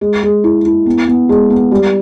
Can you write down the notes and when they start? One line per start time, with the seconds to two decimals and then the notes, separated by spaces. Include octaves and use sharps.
0.01 G#3
0.23 G#3
0.44 E4
0.66 E4
0.86 B3
1.08 B3
1.29 G#3
1.50 B3
1.71 G3